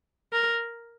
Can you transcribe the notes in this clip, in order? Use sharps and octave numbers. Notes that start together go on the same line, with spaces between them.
A#4